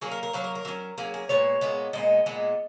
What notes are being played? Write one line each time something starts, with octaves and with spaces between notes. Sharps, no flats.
F#3 A#3 C#4 G#4
A#4
A#4
F#3 A#3 C#4 B4
A#4
A#4
F#3 A#3 C#4
F#3 A#3 C#4 G#4
G#4
A#2 G#3 B3 C#5
A#2 G#3 B3
A#2 G#3 B3 D#5
A#2 G#3 B3